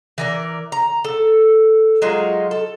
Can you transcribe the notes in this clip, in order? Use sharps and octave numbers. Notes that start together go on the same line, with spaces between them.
E3 A#4 D5
A#5
A4
F#3 G#3 D#4 F4
A4